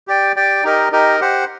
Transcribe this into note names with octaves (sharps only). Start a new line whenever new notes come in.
G4 D5 G5
G4 D5 G5
D#4 G4 A#4 D#5
D#4 G4 A#4 D#5
G4 C5 F#5